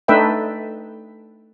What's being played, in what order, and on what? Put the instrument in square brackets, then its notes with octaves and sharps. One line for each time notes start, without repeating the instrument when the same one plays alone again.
[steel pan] A3 D4 D#4 B4 E5 G5